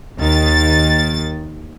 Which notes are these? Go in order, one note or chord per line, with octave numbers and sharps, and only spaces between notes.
D#2 D#3 A6